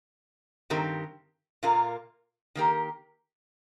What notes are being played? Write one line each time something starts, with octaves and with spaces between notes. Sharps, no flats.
G2 D#3 C4 G4 A#4
A#2 A#3 F4 A#4
D#3 A#3 G4 A#4